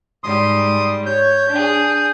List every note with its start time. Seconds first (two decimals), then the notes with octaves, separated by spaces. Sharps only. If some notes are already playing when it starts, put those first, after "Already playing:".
0.24 G#2 G3 C6 D#6
1.06 C#5 G6
1.50 D4 G#4